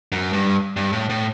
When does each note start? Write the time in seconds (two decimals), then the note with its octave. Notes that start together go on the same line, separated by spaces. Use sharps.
0.12 F#2
0.33 G2
0.76 G2
0.93 A2
1.09 A2